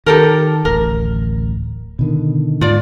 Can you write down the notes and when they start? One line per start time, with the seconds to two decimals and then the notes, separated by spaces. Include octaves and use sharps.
0.06 D#3 G4 A4 A#4
0.65 D1 A1 A#4
1.99 B2 D3 D#3
2.61 G#2 F4 D5